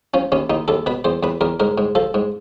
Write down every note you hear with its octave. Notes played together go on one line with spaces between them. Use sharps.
F3 C#4
D#2 C#4
D#2 D#4
D#2 A4
B2 B4
E2 C5
E2 B4
E2 A#4
G#2 A#4
G#2
F3 A4
G#2